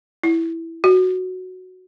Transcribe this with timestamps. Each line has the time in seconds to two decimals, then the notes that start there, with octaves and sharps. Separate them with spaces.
0.24 E4
0.84 F#4